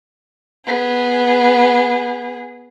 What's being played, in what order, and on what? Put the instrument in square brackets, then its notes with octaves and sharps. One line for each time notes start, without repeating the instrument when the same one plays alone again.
[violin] B3 G#4